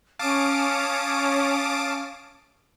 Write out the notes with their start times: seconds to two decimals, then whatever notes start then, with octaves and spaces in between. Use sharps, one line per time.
0.19 C#4 F5 A5 D6 D#6 D7